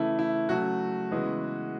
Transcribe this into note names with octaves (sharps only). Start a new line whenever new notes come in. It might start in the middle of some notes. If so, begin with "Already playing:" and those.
Already playing: C#3 E3 A3 E4
E4
C#3 F#3 A3 F#4
C#3 E3 G#3 B3